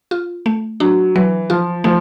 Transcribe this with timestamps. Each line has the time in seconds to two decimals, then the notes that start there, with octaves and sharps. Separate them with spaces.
0.11 F4
0.46 A3
0.80 F#3 D4
1.15 E3 F#3
1.50 F3 F4
1.84 F3 A3